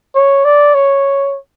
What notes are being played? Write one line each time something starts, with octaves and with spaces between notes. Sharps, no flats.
C#5
D5
C#5